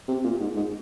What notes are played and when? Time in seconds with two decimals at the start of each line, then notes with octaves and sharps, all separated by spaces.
0.08 C3
0.24 A#2
0.40 G#2
0.56 G#2